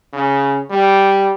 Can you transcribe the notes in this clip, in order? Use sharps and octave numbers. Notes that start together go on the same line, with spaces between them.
C#3
G3